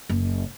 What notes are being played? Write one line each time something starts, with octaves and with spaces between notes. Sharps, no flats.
F#1